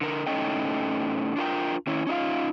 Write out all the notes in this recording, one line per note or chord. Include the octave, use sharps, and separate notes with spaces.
D3 A#4
A2 C#4 D#4 A4 D#5 G5
D4 F4 A#4 G5
D#3 C#4 E4
C#4 D#4 F4 F5